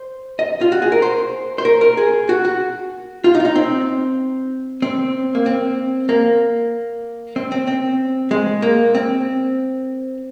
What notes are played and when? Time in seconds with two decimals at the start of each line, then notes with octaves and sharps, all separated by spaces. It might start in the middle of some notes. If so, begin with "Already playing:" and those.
Already playing: C5
0.39 D#5
0.61 F4
0.72 F#4
0.82 G#4
0.92 A#4
1.02 C5
1.58 C5
1.65 A#4
1.81 A#4
1.97 G#4
2.29 F#4
2.45 F#4
3.24 F4
3.35 D#4
3.40 F4
3.45 D#4
3.55 C4
4.82 C4
5.35 A#3
5.46 C4
6.09 A#3
7.36 C4
7.52 C4
7.67 C4
8.31 G#3
8.62 A#3
8.95 C4